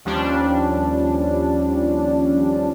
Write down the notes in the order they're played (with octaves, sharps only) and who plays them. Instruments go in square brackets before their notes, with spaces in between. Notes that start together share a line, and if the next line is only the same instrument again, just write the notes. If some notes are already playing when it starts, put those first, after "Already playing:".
[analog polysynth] D#2 F3 G3 C#4 D4